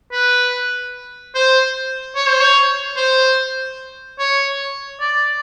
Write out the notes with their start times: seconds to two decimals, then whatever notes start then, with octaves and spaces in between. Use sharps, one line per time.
0.12 B4
1.35 C5
2.15 C#5
2.28 C5
2.40 C#5
2.97 C5
4.19 C#5
5.00 D5